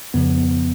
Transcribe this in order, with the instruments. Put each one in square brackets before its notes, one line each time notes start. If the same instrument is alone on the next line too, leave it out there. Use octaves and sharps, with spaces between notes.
[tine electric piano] F2 C#3 F3 B3